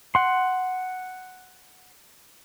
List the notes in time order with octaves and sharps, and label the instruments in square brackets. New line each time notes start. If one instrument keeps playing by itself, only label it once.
[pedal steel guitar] F#5 C6